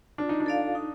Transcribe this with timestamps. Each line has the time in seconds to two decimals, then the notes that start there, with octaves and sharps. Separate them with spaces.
0.18 D4 F4
0.29 D#4
0.40 D4
0.46 A4 D5 F5
0.75 D#4